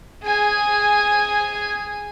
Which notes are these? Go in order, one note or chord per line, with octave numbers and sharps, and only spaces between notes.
G#4 G#5